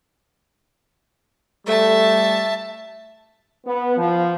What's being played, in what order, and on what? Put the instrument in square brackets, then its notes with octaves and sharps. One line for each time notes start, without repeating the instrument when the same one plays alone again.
[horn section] G3 A3 [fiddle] E5 A5
[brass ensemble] B3
F3